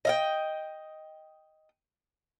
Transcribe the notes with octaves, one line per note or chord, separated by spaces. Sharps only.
D#5 F5 G5